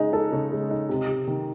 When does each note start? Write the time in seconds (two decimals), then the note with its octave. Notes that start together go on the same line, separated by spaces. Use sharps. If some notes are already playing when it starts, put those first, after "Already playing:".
Already playing: C#3 G#3 D#4
0.13 A4
0.32 C#3
0.52 G#3
0.71 D#4
0.89 C3
1.08 C3
1.28 D#3